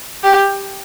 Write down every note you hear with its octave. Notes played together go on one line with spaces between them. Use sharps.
G4